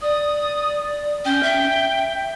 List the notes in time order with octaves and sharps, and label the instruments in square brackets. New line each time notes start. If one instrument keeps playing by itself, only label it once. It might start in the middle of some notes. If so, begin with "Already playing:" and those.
[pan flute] D5 [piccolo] D#6
[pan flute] C#4 [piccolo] G5
[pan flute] E5